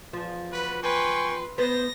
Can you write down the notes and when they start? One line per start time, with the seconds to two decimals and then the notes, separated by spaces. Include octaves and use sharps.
0.13 E2 F3
0.51 F#4 B4
0.83 B4 G5 G#5 C6 C#6
1.58 B3 B4 C5 A#6